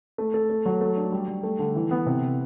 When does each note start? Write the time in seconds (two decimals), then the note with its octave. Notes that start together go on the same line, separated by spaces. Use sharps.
0.18 A3
0.34 A4
0.50 A3
0.66 F#3
0.81 A3
0.97 D4
1.12 G3
1.28 G3
1.43 A3
1.59 D3
1.76 E3
1.91 B3
2.06 C3